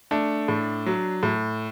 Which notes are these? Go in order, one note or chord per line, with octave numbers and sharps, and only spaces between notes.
A3 D4
A2
F#3
A2